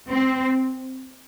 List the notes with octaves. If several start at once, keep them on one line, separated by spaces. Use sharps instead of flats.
C4